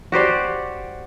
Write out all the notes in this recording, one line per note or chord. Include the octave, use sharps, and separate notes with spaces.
F#4 G4 C5 D5